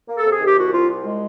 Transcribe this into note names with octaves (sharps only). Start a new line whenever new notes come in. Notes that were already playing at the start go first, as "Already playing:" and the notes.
A#3
A4
C3
G#4
D#3
G4
C2 F#4
C3 F4
C2
G#3